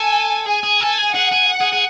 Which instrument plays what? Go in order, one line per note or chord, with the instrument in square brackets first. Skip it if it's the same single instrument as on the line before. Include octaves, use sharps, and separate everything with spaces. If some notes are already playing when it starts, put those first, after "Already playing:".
Already playing: [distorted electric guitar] A4 [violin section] G#5
[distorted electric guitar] G#4 [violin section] G#5
[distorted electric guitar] G#4
[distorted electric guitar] A4 [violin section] G#5
[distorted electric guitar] G#4
[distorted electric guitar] G#4 [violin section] F#5
[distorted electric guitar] G#4
[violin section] F#5
[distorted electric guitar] G#4
G#4